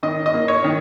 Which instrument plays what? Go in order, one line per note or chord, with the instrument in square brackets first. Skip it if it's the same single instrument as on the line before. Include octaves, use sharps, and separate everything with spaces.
[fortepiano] D#3 D#5
D#5
A#3
C#5
D#3